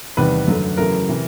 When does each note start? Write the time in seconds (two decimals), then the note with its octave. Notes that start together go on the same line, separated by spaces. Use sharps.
0.17 E2 C3 D#3 G3 B4
0.48 F#2 D3 F#3 A3
0.77 F#2 C#3 E3 A3 A#4
1.09 C3 E3